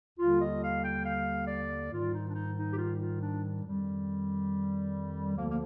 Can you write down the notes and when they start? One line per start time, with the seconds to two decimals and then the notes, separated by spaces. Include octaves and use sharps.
0.19 D#2 D3 G3 F4
0.40 D#5
0.62 F5
0.83 G5
1.04 F5
1.47 D5
1.91 G#2 D#3 G3 F4
2.12 D#4
2.28 D4
2.34 D#4
2.56 D#4
2.71 G4
2.77 F4
2.98 F4
3.19 D4
3.63 F2 D#3 G3
5.35 D2 D3 F3 A#3
5.49 A#3